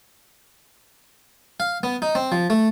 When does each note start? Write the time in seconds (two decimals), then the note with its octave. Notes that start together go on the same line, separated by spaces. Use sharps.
1.60 F5
1.83 B3
2.02 D#4
2.15 C4
2.32 F3
2.50 A3